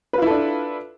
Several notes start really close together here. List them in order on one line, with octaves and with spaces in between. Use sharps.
B4 F4 E4 A4 D4